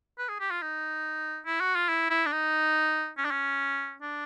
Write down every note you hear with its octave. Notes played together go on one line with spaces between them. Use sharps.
B4
G#4
G4
F4
D#4
E4
F#4
F4
E4
E4
D4
D#4
C#4
D4
C#4
D4